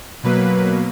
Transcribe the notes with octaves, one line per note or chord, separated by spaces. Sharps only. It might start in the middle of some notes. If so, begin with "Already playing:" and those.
B2 F#3 A#3 B4